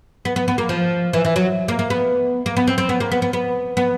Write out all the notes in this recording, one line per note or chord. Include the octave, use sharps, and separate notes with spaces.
B3
B3
B3
A#3
F3
E3
E3
F#3
A#3
A#3
B3
A#3
B3
C4
C4
B3
A#3
B3
B3
B3
B3